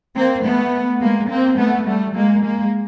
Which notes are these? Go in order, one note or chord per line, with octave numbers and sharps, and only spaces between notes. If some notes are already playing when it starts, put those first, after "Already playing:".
A#3 C4
A3 B3
G#3 A#3
A#3 C4
A3 B3
G3 A3
G#3 A#3
G#3 A#3